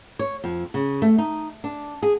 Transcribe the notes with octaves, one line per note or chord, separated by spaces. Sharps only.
C#5
F2
C#3
A3
D#4
D4
G#4